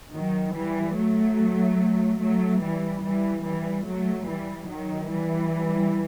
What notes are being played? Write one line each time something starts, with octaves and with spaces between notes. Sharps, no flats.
D#3 F#3
E3 G3
F#3 A3
F#3 A3
E3 G3
E3 G3
E3 G3
F#3 A3
E3 G3
D#3 F#3
E3 G3